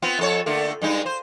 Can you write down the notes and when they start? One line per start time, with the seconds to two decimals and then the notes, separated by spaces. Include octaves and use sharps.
0.02 B3 C4 F4
0.19 F2 A4 C#5
0.46 D3 A3 A#3
0.82 G2 G#3 D#4
1.06 C5